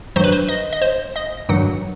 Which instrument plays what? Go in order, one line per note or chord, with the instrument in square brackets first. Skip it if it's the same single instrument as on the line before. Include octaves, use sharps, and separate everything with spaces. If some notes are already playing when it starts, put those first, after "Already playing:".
[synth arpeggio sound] G2 D#3 F#3 C5
B4
C5
D#5
D#5
C5
D#5
G2 D#3 F#3 F#5